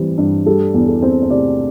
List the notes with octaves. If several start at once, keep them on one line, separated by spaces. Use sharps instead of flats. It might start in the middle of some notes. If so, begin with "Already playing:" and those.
Already playing: E3 G3 C4
G2
G3 A4
E2
A4
C4
C5
C3 D5